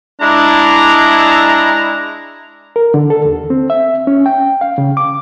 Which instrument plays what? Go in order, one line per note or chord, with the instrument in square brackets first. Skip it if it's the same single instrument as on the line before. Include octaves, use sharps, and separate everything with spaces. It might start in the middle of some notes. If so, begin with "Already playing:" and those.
[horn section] G#3 E4 A#5 [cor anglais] D4
[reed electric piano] A#4
D3
A4
D#2
C4
E5
C#4
G5
F5
C#3
D6